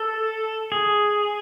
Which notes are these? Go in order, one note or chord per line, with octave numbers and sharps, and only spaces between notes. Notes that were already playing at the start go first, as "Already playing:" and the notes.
Already playing: A4
G#4